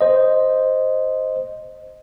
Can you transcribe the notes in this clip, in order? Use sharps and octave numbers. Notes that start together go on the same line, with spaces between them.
C5 D#5